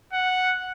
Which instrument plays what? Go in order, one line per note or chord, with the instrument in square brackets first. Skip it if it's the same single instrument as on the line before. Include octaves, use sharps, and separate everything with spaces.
[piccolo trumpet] F#5